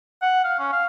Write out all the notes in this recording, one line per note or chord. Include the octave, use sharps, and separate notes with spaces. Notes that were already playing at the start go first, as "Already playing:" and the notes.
F#5
F5
C#4
F5